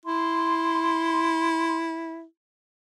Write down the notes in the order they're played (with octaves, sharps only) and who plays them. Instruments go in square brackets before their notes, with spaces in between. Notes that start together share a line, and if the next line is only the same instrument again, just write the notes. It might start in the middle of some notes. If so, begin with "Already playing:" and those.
[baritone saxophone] E4 [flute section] C6